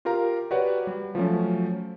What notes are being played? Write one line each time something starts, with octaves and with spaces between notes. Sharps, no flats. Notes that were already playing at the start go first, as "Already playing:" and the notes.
F4 G4 A#4 F5 A#5
F#4 G4 B4 C#5 D5 F#5
G3
F3 F#3 A3 C#4